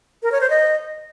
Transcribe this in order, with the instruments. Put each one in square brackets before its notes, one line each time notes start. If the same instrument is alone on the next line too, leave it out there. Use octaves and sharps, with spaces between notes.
[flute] A#4
C#5
C5
D#5